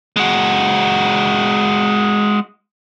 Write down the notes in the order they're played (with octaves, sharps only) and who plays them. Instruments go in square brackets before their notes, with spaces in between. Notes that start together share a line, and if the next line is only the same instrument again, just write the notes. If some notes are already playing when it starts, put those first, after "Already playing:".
[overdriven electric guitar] G#3 F#4